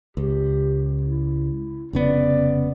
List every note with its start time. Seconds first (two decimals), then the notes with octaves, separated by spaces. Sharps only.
0.17 C#2 G4
1.03 E4
1.93 F1 C#3 B3 D5